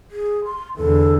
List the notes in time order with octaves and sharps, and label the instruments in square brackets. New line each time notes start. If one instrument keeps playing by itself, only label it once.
[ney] G#4
C6
[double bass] E2 D3 [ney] A4